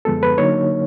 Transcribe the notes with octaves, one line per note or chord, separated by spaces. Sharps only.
F#2 D3 F3 G#3 B3 A4
B4
D3 F#3 A#3 D#4 C#5